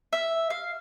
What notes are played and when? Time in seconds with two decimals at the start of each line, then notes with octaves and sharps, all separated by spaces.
0.13 E5
0.50 F5